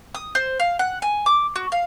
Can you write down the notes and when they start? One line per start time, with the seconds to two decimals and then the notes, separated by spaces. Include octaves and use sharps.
0.14 D#6
0.35 C5
0.60 F5
0.79 F#5
1.02 G#5
1.26 D6
1.56 F#4
1.72 F5